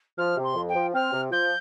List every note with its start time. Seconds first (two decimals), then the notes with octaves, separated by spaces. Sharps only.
0.18 F3 F6
0.37 C3
0.43 C6
0.56 F2
0.69 G5
0.75 F3
0.94 C4 F6
1.13 C3
1.31 F3 G6